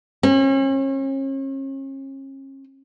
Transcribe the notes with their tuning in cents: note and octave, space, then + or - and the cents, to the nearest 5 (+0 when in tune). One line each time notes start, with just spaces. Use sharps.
C#4 -40